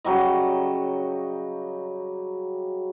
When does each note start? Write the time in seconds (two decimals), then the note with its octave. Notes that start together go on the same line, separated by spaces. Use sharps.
0.05 C#3 F#3 G3 D#5